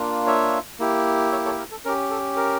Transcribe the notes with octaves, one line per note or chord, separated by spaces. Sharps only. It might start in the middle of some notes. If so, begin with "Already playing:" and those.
Already playing: A#3 D4 F4
C#5 E5
A#3 E4 G4
C#5 E5
A4 C#5
A#4
A4
C#4 G4 A#4
A4
A#4